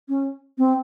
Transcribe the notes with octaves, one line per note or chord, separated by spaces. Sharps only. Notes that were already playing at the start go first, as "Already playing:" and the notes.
C#4
C4